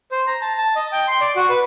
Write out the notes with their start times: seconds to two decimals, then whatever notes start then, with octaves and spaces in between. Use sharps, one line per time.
0.12 C5
0.27 A#5
0.42 A5
0.58 A5
0.76 D#5
0.92 G5
1.08 C6
1.21 D5
1.36 F#4
1.49 B4